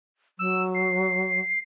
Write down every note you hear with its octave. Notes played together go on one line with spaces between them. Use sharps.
F#3 E6
C7